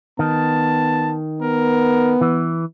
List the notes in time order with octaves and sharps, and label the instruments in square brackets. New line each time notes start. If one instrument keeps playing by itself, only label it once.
[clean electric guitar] D#3 [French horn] B3 [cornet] A5
[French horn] B3 [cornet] A#4
[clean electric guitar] E3